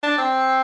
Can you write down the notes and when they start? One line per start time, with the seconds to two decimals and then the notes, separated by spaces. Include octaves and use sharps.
0.03 D4
0.18 C4